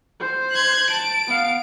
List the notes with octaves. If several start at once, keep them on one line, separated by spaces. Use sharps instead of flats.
C5
F#6 G#6
A5 D7
B3 F5